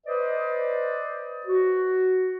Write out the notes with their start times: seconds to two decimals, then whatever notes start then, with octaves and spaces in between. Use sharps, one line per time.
0.06 B4 C5 D5 D#5
1.46 F#4